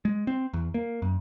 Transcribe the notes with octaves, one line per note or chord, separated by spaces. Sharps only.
G#3
C4
E2
A#3
F#2